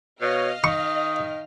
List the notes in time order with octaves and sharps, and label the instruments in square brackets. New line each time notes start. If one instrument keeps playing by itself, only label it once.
[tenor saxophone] B2 [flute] C#5 [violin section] D#5 F5 F6
[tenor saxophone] D#3 [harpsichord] C#6 [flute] D#6